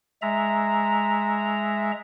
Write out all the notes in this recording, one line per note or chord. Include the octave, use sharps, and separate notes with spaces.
G#3 E5 A#5